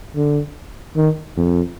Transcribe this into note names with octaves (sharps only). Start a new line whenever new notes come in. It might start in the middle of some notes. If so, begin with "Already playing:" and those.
D3
D#3
F2